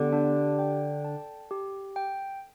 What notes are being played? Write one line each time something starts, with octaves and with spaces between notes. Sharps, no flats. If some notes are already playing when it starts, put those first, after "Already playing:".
Already playing: D3 B3 G4
D4
G5
A5
G4
G5